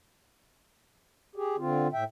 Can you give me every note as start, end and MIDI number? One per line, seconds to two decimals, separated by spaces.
1.35 1.56 67
1.35 1.56 68
1.58 1.88 50
1.58 1.88 60
1.58 1.88 65
1.93 2.04 45
1.93 2.04 76
1.93 2.04 79